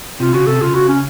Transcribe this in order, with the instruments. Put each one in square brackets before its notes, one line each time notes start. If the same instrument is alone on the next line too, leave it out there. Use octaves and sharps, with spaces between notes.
[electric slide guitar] C3 [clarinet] F4
[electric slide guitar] C#3 [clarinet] F#4
[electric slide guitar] C3 [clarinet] A4
[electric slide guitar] C#3 [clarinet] F4
[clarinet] F#4
C#4